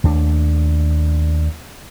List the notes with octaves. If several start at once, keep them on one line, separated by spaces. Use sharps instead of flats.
D#2 A3 D4